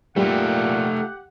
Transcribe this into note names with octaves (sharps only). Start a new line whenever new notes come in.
A#2 G3 A3 F4 G4 F#5